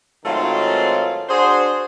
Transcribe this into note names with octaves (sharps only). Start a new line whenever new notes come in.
G#2 D#3 F#3 A3 C4 F4
D4 F#4 G#4 C5